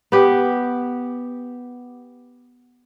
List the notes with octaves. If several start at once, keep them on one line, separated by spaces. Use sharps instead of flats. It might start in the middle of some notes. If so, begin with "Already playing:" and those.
B3 G4